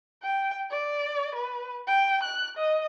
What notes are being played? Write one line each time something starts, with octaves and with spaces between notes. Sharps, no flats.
G5
D5
B4
G5
F#6
D#5